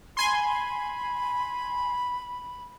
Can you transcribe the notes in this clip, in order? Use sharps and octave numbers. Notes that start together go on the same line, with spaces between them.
G#5 B5 C6